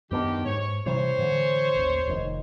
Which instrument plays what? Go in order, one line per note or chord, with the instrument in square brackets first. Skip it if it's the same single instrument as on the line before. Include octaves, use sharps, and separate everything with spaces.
[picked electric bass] F#2 B3 D4 [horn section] D#3 G4
[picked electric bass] G#2 [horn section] C#5
[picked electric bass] C3 E3 G3 [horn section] C5 C#5
[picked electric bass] A2 D3 E3
A1 D#2
F1 B2 D#3